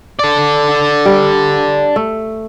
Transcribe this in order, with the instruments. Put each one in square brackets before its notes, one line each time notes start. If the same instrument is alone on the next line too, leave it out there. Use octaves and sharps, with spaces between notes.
[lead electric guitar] A4 D5
[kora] G3
A3